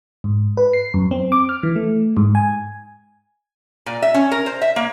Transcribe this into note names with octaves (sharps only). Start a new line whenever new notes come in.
G#2
B4
C7
F#2
C4
D6
F6
E3
A3
G#2
G#5
A#2
E5
C#4
A#4
C5
E5
A#3